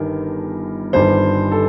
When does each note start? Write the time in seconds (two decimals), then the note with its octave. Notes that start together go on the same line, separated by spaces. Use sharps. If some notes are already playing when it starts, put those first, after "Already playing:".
Already playing: G1 G2 D#3 G3 A#4
0.93 G1 G2 D#3 G3 C5
1.52 A4